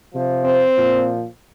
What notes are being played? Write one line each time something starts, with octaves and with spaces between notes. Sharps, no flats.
C3 F3
C4
A#2 F3